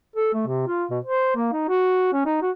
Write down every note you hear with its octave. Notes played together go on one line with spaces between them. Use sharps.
A4
A3
C3
F4
B2
C5
A#3
D#4
F#4
C#4
D#4
F#4